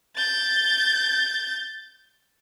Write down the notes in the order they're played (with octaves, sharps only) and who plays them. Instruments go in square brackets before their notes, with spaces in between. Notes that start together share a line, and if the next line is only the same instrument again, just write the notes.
[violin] G6 A6